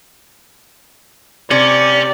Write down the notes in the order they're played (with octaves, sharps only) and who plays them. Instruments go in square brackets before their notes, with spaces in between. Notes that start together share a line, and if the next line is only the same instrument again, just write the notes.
[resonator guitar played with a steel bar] C3 [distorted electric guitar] C#4 [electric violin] D5